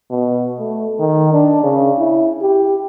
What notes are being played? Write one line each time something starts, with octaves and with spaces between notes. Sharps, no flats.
B2
A3
D#3
D4
C#3
E4
G4